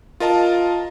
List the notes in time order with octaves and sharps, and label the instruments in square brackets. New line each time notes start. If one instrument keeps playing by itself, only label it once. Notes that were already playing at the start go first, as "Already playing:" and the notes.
[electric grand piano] F4 A#4 D#5 A5